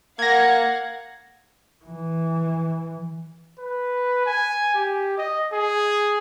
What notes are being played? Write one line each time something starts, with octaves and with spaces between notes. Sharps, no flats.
A#3 F5 F#5 G#6 A#6
E3
B4
G#5
G4
D#5
G#4